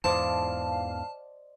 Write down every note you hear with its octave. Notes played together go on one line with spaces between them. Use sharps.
E2 G#2 E3 C5 D5 D#5 F5 A5